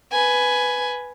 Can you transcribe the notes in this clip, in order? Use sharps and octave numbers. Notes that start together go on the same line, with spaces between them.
B4 G#5